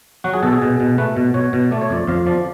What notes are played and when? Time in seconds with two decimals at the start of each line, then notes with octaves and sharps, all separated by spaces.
0.24 F#3 F#4
0.34 G#4
0.43 B2 A4
0.53 G#4
0.62 B2
0.80 B2
0.98 A3 B4
1.16 B2
1.34 B2 C#5
1.53 B2
1.71 A3 D5
1.81 C#5
1.90 F2 D5
2.07 F2 F5
2.26 F3 D5